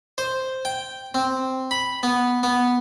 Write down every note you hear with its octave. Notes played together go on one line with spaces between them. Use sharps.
C5
G5
C4
B5
B3
B3